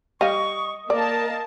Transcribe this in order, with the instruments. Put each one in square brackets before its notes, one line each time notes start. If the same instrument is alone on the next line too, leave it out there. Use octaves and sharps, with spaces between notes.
[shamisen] G3 F5 [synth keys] D#5 [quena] C#6
[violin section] A#3 A5 [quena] A#4 [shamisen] D5